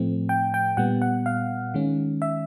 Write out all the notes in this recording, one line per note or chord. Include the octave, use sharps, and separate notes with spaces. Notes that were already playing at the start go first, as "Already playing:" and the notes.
Already playing: A2 F3 A3 C4
G5
G5
A#2 G3 B3 F#5
F#5
F5
D#3 G#3 C#4
E5